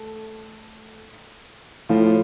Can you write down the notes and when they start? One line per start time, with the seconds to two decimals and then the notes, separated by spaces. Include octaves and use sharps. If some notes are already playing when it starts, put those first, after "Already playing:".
Already playing: A3 A4
1.89 A2 F3 F4